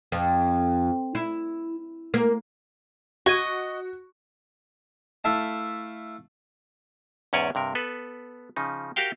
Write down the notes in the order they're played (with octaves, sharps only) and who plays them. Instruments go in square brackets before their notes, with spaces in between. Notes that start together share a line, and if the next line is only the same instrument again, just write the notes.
[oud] F2
E4
A#3
[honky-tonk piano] F#4 [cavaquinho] D#5 [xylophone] C#6 G#6 D#7
[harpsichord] A3 E4 F5 A5
[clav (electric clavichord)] E2 G#2 C#4 C#5 D5 G#5
G2 C3 A#4
B3 A4 B4
C#3 F3 D#4
F#4 G4 A#4 F5 G5